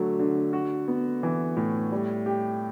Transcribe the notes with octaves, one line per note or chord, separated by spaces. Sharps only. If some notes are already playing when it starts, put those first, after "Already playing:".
Already playing: D3 F#3 A3
D3
F#4
B3
E3
A2
G3
G4